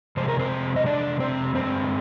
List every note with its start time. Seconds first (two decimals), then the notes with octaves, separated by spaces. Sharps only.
0.17 C3 F3 G#3 C5
0.28 A#4
0.39 C4 C5
0.76 D#5
0.86 D4 D5
1.20 C4 C5
1.55 G2 D3 G#3 C4 C5